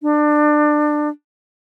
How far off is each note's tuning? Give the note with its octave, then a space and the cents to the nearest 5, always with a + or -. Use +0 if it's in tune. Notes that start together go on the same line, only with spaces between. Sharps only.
D4 +25